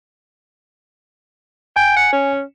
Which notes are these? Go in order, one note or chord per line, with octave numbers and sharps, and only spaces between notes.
G5 G#5
F#5
C#4